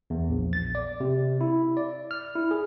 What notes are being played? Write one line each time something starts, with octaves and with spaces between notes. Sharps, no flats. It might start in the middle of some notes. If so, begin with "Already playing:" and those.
E2
A#1
A6
D5
C3
E4
D5
F6
E4
G#4